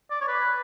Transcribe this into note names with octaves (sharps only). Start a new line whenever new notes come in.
D5
C#5
B4